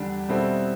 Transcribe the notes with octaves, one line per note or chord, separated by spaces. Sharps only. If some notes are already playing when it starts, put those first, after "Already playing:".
Already playing: E2 D3 G3 D4
B2 G3 C4 E4 A4